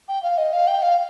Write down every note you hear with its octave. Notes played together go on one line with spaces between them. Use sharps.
G5
F5
D#5
F5
G5
F5